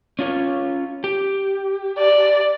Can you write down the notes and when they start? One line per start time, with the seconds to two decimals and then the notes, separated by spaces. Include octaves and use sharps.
0.19 C#4 F4 C#5
1.04 G4
1.98 D5